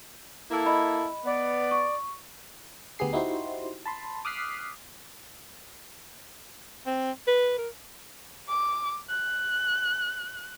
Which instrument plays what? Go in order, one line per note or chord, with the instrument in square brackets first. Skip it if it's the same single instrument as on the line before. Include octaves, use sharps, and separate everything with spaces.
[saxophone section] A#3 E4 [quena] A4
[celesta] D#5 B5
[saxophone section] B3 [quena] D5
[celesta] C#6
[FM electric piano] D2 B3 G4 G#4 C7
D#4 E4 F#4 G4 C5 C6
A5 B5 C6
D6 D#6 F6 F#6 B6 C7
[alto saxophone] C4
B4
A#4
[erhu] D6
F#6